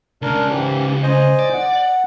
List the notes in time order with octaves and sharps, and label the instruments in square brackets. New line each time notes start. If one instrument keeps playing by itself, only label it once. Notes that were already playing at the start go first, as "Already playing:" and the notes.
[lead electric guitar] C#2 C#3 [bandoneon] D4 A#4
[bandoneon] G#2 E3 G4
C5 D#5 G#5
[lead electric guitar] D5
[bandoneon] F#5